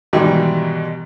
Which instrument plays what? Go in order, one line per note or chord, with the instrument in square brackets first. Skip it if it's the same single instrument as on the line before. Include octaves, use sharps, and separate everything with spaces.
[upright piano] G#2 B2 D#3 E3 G3